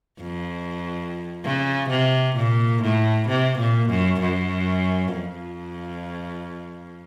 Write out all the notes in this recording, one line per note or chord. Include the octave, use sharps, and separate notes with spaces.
F2
C#3
C3
A#2
A2
C3
A#2
F#2
F#2
F2